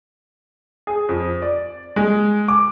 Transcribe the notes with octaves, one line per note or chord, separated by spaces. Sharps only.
G#4
F2
D5
G#3
D6